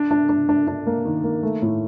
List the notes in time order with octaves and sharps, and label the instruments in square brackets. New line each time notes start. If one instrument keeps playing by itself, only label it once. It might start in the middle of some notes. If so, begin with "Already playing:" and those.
Already playing: [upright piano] D4
D4
D4
D4
D4
A#3
D#3
A#3
A3
A2